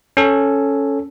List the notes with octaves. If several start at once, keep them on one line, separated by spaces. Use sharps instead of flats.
C#4 A4